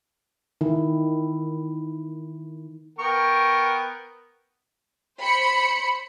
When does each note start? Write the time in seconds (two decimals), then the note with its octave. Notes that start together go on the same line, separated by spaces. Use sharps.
0.61 D#3 E4
2.99 B3 A#4 G5 C#6
5.20 C5 B5 C#7